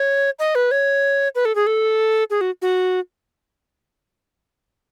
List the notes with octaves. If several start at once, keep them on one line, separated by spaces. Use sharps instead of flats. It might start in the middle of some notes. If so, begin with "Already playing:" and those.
Already playing: C#5
D#5
B4
C#5
B4
A4
G#4
A4
G#4
F#4
F#4